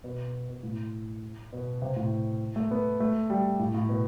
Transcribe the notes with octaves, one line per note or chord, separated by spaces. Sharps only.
B2
B2
A2
B2
C3
A2
A3
B3
A3
G3
A2
A2
B2